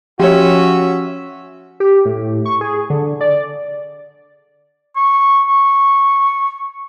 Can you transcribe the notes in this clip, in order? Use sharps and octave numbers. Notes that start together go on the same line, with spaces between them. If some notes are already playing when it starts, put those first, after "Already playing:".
F3 C#4 F#4 G4 C#5 E5
G4
A2
C#6
G#4
D3
D5
C#6
C#6